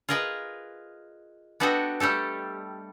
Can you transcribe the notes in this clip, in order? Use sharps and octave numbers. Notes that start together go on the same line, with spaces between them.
F4 G#4 A#4 B4 D#5
B3 D4 F#4 G4 A4 D#5
G3 A3 G4 A4